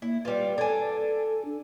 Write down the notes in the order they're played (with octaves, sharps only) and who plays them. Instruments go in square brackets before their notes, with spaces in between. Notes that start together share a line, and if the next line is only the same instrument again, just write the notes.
[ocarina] A#3 [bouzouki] E4
[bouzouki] G3 F4 [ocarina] B4
[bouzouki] D4 G#5 [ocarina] A4
[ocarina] D4